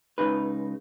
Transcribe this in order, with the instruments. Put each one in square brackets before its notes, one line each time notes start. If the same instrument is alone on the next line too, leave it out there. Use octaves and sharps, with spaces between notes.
[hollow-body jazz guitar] C#2 G#2 C#3 D#4 B4